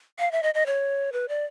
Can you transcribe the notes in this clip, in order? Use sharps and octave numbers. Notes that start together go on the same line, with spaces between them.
F5
E5
D#5
D#5
C#5
B4
D5